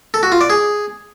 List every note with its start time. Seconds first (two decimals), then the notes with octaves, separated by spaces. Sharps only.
0.14 A4
0.23 F#4
0.32 F4
0.41 D5
0.50 G#4